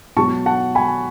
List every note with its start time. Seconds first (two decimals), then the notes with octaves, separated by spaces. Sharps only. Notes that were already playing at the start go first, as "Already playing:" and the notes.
0.17 B2 F#3 A5 C#6
0.46 F#5 A5
0.75 G#5 B5